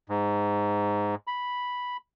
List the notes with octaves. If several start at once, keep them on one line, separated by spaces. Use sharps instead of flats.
G#2
B5